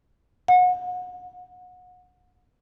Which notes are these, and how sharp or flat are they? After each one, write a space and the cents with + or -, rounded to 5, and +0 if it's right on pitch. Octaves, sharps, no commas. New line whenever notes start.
F#5 -30